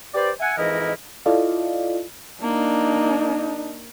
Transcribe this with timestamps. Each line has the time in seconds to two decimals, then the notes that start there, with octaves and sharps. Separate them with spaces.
0.14 G4 B4 C5 D5
0.40 E5 F#5 G#5
0.58 F2 G#2 E3 E4 A#4 D#5
1.26 E4 F4 A4 D5 D#5 F5
2.43 A#3 D4 D#4